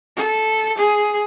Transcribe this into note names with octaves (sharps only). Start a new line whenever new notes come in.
A4
G#4